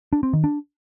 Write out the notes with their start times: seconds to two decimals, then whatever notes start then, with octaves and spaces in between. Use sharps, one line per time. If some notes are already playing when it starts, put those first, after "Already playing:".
0.13 D4
0.23 C4
0.33 D#3
0.44 D4